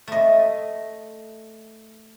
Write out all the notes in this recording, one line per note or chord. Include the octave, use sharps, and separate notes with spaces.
A3 D#5